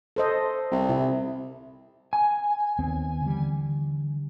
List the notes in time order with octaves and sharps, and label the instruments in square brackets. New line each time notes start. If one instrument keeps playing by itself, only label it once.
[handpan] A4 C5 D#5
[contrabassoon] C2
[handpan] C3 E4
[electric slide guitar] G#5
[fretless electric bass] D#2 B3 C4
D3 E3 G3